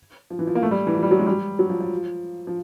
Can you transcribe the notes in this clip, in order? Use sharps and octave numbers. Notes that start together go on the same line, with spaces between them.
F3
E3
F3
A#3
A3
G3
E3
F3
G3
F#3
G#3
G3
F#3
F3
F3
F3